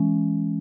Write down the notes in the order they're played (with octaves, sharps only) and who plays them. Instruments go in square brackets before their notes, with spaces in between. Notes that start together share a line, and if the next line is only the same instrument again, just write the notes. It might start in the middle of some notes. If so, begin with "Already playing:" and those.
Already playing: [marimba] E3 G#3 C#4